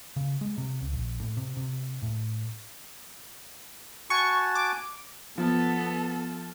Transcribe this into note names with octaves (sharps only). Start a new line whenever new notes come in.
C#3
G#3
C3
C#2
A#1
A2
C3
C3
A2
F#4 G#5 A5 C#6
D6
F3 B3 A4